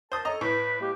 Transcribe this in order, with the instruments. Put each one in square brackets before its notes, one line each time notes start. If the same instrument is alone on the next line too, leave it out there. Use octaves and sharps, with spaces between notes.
[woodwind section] A#4 A5 [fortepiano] C5 D#6
[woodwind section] A4 C#5 [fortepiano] D#5 A#5
[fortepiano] A2 [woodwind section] B4
[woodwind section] G#3 A#3 G4